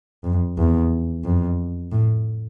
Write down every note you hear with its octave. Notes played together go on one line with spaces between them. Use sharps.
F2
E2
F2
A2